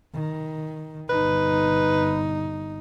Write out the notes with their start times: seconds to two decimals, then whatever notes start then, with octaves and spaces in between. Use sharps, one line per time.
0.14 D#3
1.09 G1 D#4 B4